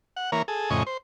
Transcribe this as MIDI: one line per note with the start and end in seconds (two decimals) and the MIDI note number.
0.17 0.31 78
0.32 0.42 52
0.32 0.42 58
0.32 0.42 70
0.32 0.42 73
0.48 0.70 68
0.48 0.70 69
0.70 0.83 41
0.70 0.83 45
0.70 0.83 49
0.70 0.83 75
0.70 0.83 80
0.70 0.83 85
0.87 0.97 72